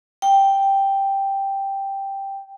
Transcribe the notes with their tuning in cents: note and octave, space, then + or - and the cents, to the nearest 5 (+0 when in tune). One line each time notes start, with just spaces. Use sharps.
G5 +0